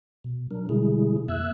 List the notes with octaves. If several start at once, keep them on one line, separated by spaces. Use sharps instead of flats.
B2
F#3 D4 A#4
B2 D3 G3 G#3 E4 G#4
F2 A#3 E5 E6 F#6 G#6